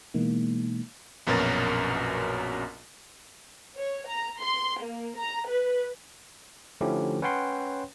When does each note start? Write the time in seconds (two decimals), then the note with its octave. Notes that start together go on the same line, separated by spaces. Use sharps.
0.14 B2 E3 G#3 A#3 D#4
1.27 A#1 F#2 B2 C#4 A#4 A6
3.78 C#5
4.08 A#5
4.42 C6
4.81 A#3
5.18 A#5
5.49 B4
6.81 D3 F3 A3 C#4 E4 G4
7.22 C#4 B4 C#5 F#5 G5 C6